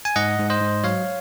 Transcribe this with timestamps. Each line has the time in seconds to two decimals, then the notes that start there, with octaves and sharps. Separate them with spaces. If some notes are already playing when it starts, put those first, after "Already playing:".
0.05 G#5
0.16 G#2 D#5 F#5
0.39 G#2
0.50 C5 D#5
0.61 G#2
0.84 F#3 C#5 F5